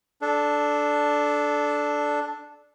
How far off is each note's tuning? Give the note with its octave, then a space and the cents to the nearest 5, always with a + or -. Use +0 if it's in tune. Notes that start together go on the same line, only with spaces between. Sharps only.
D4 +0 A4 -20